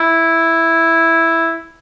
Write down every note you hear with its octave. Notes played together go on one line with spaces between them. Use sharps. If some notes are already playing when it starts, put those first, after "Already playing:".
Already playing: E4